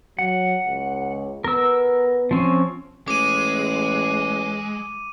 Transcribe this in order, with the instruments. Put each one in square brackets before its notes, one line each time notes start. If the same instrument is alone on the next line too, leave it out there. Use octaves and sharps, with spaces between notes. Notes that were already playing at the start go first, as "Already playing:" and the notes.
[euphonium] F#3 [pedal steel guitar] F#5
[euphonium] C#2
[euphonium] B3 [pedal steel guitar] A#4 E6
[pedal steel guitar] F3 C4 C#4
[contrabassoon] A1 [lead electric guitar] G#3 [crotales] D6 D#7